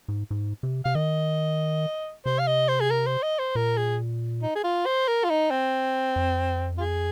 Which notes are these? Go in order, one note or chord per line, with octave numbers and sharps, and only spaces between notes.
G#2
G#2
C3
C3 F5
D#3 D#5
C3 C5
F5
D#5
C5
G#4
A#4
C5
D#5
C5
A#2 A#4
G#4
D#4
G#4
F4
C5
A#4
F4
D#4
C4
F2
F4
G#4